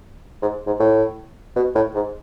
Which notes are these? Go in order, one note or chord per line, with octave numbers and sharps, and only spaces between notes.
G#2
G#2
A2
B2
A2
G#2